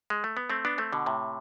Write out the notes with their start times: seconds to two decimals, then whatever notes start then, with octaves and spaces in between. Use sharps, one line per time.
0.10 G#3
0.24 A3
0.37 B3
0.50 A3 C4
0.65 B3 D4
0.78 A3 C4
0.93 B2 D3
1.06 A2 C3